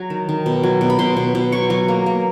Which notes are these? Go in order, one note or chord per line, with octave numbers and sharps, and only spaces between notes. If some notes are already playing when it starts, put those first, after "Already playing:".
Already playing: F#3 A#5
D#3
D#3
B2
F#3
B2
B5
B2 C6
B2
B2
F#3 C#6
F#3
A#3
A#3